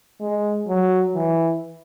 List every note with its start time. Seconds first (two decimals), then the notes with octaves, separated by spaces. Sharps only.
0.20 G#3
0.67 F#3
1.15 E3